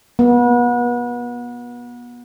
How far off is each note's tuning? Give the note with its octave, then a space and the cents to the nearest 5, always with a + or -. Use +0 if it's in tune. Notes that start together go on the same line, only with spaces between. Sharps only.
B3 -35